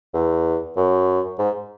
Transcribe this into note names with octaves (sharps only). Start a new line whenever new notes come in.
E2
F#2
G#2